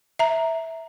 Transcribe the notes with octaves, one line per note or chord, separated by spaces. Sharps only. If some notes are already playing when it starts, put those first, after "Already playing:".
E5 A#5